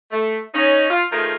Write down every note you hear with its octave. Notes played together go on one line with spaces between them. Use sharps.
A3
C#4 D#4
F4
D#3 F3 A3 F4 G#4 A#4